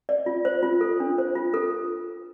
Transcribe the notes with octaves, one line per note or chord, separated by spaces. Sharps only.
D5
F4
C5
F4
A4
D4
C5
F4
A4